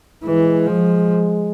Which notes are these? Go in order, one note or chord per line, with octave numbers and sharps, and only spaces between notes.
E3 G#3
F3